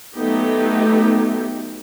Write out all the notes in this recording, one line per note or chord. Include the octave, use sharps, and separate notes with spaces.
F#3 A3 B3 D#4 G4